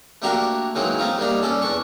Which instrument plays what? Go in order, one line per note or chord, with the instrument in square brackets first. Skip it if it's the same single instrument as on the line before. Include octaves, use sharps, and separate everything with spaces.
[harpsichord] A3 A#3 D4 F#4 G4 A#4
D#3 E3 F#3 G#3 A#3
A3 C4 D#4 F4
G3 A#3 D4 D#4
A#2 C#4 A4 D5
E2 D4 C#6